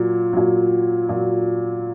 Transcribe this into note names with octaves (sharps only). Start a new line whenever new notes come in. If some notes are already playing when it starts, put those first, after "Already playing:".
Already playing: A#2 F#3
A#2 F#3
A#2 F#3